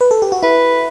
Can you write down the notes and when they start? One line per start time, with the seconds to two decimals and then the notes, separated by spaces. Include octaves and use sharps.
0.01 B4
0.11 A4
0.22 G4
0.32 F#4
0.43 E4 B4